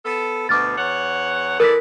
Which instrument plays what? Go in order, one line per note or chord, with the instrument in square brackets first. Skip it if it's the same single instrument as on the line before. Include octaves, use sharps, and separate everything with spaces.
[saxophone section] B3 A4
[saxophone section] D2 B2 [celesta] D6 F6 A6
[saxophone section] E2 C#5 F#5
[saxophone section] E3 A4 D5 [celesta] A#4 F#6 B6